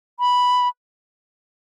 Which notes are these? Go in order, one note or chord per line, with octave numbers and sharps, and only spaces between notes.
B5